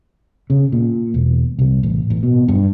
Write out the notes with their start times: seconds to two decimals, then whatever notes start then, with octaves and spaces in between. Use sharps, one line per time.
0.50 C#3
0.72 A#2
1.14 E1
1.59 C2
1.83 A1
2.10 A1
2.23 B2
2.48 G2